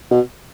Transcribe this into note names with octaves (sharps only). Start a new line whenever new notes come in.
B2